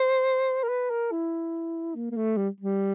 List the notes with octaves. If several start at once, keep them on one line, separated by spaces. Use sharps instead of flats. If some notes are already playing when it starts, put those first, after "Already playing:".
Already playing: C5
A#4
B4
A#4
E4
A#3
A#3
A3
G3
G3